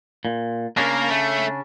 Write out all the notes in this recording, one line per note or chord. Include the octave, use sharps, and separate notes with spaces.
A#2
C#3 A#3 C#4 D4 A#4
A3